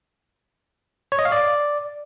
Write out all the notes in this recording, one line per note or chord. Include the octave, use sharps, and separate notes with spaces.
C#5
D#5
F5
D5